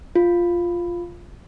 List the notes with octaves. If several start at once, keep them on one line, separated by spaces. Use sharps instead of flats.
F4